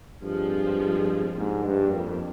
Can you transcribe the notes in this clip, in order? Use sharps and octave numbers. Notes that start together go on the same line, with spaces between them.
G2 F3 G#3 C4 F4 G#4
G#2 G3 A#3 D4
G2
F2